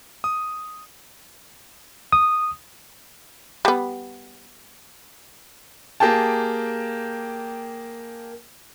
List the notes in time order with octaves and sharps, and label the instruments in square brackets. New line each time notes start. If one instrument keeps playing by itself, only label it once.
[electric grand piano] D#6
[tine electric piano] D#6
[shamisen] G3 B3
[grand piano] A#3 G4 G#4 G5 A5